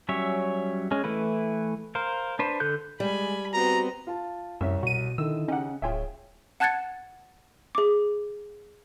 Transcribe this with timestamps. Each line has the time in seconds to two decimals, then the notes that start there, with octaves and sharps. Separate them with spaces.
0.09 F#3 G3 C#4 C#5 E5
0.91 G#3 C#4
1.04 E3 A3 E4 B4
1.95 A#4 C5 F5
2.39 D4 B4 C5
2.60 D3 A4 F#6 G6
3.00 G3 G#3 G#5 B5
3.53 B3 C4 F#4 A#5
4.07 F4 A5
4.61 C2 F#2 C#5 E5
4.83 B2 F#4 D#7
5.18 D3 D#3 D#4 E4 E6
5.48 C#3 C#4 D#4 G4 F#5
5.82 D1 F4 G#4 C#5 E5 G5
6.60 F#5 A5 F#6 G#6 A6 C#7
7.75 G#4 D6